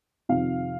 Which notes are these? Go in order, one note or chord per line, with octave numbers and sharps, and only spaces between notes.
F2 C3 D#3 F5